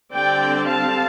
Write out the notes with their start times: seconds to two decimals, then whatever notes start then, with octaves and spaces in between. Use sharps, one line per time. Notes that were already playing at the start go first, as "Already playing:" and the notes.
0.14 D3 G3 C4 D5 G5
0.70 F5 A5